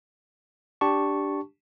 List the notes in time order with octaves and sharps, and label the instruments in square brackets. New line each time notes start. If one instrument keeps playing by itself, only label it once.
[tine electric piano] D4 G4 A5 C#6